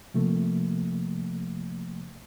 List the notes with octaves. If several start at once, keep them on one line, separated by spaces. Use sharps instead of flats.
C3 F3 A3 A#3